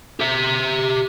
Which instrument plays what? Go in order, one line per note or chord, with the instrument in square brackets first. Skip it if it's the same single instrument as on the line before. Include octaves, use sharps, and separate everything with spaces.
[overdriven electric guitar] G4 E5